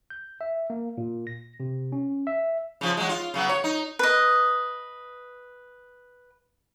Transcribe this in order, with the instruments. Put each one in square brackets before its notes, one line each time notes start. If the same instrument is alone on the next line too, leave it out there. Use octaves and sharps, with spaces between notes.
[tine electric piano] G6
E5
A#3
A#2
A#6
C3
C#4
E5
[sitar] C#3 F3 F4
F#3 G#3
F4
C#3 F#3 B3
C#5
D#4
[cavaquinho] B4 D#5